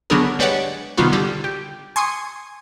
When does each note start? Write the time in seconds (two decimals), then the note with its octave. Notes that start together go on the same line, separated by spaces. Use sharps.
0.10 D3 F#3 B3 D4 G#4 A#4
0.39 G3 G#3 B4 C#5 D5 F#5
0.97 C3 D#3 G3 B3 F4 F#4
1.12 D3 G3
1.44 G4
1.96 G#5 C6 C#6 D#6